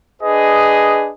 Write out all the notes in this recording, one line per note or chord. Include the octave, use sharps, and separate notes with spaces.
D4 G#4 B4 D#5